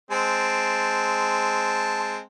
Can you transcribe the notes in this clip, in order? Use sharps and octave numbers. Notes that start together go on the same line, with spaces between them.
G#3 C4 A5